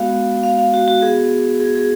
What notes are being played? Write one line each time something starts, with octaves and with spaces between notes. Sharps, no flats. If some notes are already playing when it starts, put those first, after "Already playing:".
Already playing: G#3 B3 F#4 F5
F5
F5
F#4
F#4
B3 F#4 G#4
G#4
G#4